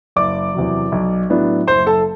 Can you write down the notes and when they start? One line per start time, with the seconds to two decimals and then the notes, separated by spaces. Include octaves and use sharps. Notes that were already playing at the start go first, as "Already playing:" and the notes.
0.16 F#1 D5 D6
0.54 E2 C3 F#3
0.92 B1
1.30 A2 F#3 B3 D4
1.67 F#1 C5 C6
1.86 A4 A5